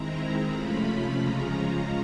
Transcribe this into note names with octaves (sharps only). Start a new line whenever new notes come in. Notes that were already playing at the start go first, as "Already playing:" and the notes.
Already playing: D#3 G#3 C4 E4 A#5
A#5
C3 F3 A3 C#4 F4 B5
C#3 F3 G#3 C#4 F4 A#5